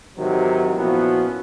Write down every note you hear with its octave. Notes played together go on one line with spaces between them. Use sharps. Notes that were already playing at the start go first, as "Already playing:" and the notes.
G#2 C3 D#3 E3 F#3
A#2 F3 B3 C#4 E4 F#4